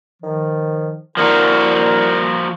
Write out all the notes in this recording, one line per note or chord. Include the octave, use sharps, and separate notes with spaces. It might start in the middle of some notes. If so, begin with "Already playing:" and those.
D#3 F3
F3 A#3 D4 E4 F#4 A#4